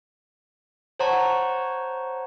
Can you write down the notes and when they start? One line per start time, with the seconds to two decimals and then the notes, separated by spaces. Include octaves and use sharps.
0.99 C5 C#5 F#5 A5 A#5 C#6